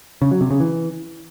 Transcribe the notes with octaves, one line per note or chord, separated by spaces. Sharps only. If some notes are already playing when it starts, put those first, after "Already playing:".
C#3
F#3
C3
C#3
E3